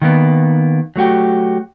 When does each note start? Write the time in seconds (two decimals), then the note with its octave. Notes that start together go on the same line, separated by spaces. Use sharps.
0.02 D#3 A#3 B3
0.96 F#3 A3 F#4 G4